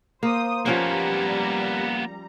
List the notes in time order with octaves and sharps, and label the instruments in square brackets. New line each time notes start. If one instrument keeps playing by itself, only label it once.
[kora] A#3 [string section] C5 D#6
[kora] F3 C#4 F#5 [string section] G3 A#5 [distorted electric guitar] A#3 B3